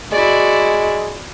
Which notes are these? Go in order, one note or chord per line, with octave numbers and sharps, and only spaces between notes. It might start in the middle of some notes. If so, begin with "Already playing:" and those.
G#3 E4 F#4 D5